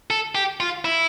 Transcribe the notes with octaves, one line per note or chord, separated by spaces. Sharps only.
A4
G4
F4
E4